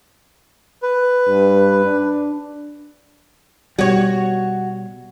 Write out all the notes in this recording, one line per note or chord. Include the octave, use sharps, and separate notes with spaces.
B4
G2
D4
B2 G3 F#4 C#5